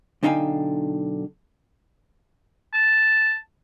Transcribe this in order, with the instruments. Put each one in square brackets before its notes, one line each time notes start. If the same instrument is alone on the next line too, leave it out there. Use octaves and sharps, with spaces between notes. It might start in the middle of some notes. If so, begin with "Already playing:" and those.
[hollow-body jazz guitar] B1 D3 D#4 F5 G5 G#5
[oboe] A5